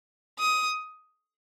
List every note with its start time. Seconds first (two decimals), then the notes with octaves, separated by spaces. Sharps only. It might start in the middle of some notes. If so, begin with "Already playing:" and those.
0.39 D#6